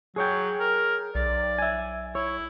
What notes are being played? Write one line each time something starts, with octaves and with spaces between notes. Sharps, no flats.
F#3 G#4 C#5 G5
A#4
B1 D5
E5 G#5
E4 C#5